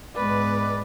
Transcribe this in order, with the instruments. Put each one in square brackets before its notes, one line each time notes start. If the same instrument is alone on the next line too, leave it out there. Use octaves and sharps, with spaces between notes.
[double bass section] G#2 G#3 B3 [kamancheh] B4 [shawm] D5